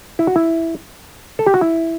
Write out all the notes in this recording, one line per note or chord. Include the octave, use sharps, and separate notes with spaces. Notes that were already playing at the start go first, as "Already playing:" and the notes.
E4
F#4
E4
A4
G4
F#4
E4